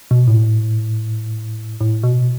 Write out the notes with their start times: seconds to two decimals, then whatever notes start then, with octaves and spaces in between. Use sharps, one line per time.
0.11 B2
0.27 A2
1.81 A2
2.03 B2